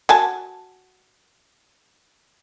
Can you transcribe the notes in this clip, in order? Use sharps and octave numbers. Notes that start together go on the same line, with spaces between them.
F#4 G#5 A5